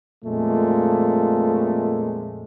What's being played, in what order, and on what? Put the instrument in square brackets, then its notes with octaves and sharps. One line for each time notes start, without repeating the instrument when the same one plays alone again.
[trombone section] F2 A#2 G#3 A3